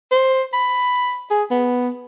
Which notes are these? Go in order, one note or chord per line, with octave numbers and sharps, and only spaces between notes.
C5
B5
G#4
B3